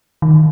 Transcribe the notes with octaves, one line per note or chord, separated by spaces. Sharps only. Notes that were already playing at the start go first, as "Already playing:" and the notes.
D#3